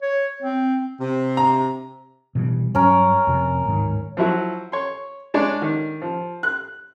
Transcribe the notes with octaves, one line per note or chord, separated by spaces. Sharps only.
C#5
C4
C3
A#5
B2 E3 G3
G2 F#3 C#4 A#4
F2 C3
D1 G#2 D#3
F3 F#3 E4 F#4
C#5 C6
G#3 D4 C#5 D5
D#3
F3
F#6